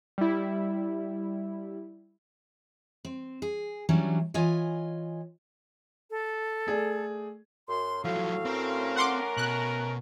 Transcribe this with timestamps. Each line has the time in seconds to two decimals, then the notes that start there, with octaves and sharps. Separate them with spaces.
0.18 G3 E4
3.05 C4
3.42 G#4
3.89 E3 F#3 G3 C#4 D4
4.34 E3 F4 C#5 D#5 G#5
6.10 A4
6.67 A3 G#4 D5
7.69 F#2 C6
8.04 A2 F3 F#3 F#4 F5
8.45 A3 C4 C#4 A#4
8.96 F#5 C6 D6
9.37 B2 F#6